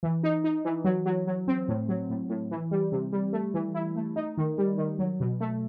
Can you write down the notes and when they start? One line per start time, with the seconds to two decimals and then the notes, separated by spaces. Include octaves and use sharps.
0.03 E3
0.23 D#4
0.44 D#4
0.65 E3
0.84 F#3
1.05 F#3
1.27 F#3
1.48 C4
1.68 A2
1.89 F#3
2.10 A2
2.30 A2
2.51 E3
2.71 G3
2.92 C3
3.12 G3
3.33 A3
3.54 E3
3.74 E4
3.96 A3
4.16 D#4
4.37 D#3
4.58 G3
4.78 D#3
4.99 F#3
5.20 B2
5.40 A3